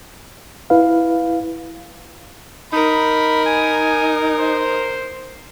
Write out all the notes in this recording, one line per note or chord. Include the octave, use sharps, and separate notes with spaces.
E4 B4 F5
D#4 A#4 B5
G#5
C5